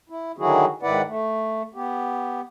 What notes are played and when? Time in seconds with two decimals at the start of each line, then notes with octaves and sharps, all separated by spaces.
0.09 E4
0.38 D3 D#3 F#3 E4 F#4 G#4
0.82 G#2 D#3 E4 B4 D5 F#5
1.07 A3
1.74 B3 G4